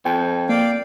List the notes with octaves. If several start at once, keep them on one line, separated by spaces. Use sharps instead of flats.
F2 G5
A#3 D5 F5 G5